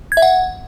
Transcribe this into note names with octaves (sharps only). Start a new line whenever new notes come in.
G#6
E5
F#5